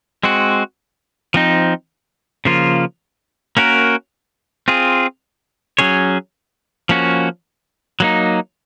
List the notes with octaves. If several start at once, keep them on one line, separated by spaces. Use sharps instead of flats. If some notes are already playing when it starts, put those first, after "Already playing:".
G#3 C4 F#4
F3 C4 D#4
C#3 F3 A#3 F4
A#3 C#4 F#4 A#4
C4 F4 G#4
F#3 C#4 G#4 C#5
F3 A#3 C#4 F#4
F#3 A#3 D#4